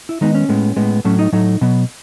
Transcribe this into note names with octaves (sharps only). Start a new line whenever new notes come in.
E4
D#3 G#3 B3 D#4
C#4
A2 G#3 B3
A2 G#3 B3
A2 F#3 A3 C#4
D#4
A2 F#3 A3 D#4
B2 F#3 B3